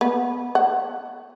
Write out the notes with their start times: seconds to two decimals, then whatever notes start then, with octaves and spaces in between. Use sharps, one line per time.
0.01 B3
0.55 F#5